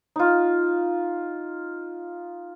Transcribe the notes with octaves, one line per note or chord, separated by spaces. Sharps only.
D#4 F4